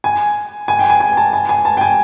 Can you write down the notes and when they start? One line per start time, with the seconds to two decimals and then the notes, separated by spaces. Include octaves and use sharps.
0.04 G#5
0.68 G#5
0.79 G5
0.90 G#5
1.00 G#5
1.17 A5
1.33 G#5
1.49 G#5
1.65 A5
1.77 G5
1.81 G#5